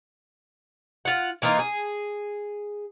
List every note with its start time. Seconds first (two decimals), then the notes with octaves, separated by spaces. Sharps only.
1.05 F4 F#5
1.42 E3 A#3 D#4 F4
1.59 G#4